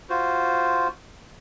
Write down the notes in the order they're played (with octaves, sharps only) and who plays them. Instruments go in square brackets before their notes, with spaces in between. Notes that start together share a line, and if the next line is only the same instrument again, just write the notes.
[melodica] F4 F#4 C5